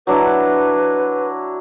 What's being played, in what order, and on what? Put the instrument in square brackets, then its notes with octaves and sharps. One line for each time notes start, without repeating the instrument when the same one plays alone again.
[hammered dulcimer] F#3 D4 E4 [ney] B4